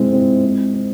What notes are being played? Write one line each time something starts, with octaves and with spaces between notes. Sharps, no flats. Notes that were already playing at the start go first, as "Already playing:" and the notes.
Already playing: G#3 C4 E4
C4
C4
C4